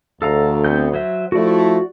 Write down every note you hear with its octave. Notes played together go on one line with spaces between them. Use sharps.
D2 A4 F5 A#5
B3 C4 G6
F#3 C5 E5
F3 A3 E4 F#4 D5